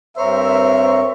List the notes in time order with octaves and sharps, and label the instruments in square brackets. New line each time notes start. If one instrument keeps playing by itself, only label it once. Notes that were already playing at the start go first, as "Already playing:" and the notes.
[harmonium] G2 C4 A#4 [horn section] C5 C#5 E5